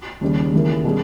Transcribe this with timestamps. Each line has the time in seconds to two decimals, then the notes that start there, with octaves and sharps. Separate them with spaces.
0.21 D#2 C#3 G3
0.52 D#2 C#3 E3 A#3
0.84 B2 G3 C#4 G#4